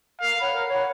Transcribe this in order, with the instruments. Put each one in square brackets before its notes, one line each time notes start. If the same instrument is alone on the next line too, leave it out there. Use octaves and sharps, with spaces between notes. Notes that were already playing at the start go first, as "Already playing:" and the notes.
[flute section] A#4 [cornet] F5
[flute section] C#5 F#5 B5
A#4
C#5 F#5 B5